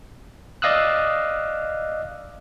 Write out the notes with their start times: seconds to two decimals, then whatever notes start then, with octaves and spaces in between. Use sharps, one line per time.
0.62 D5 D#5 F5 D#6 E6 F#6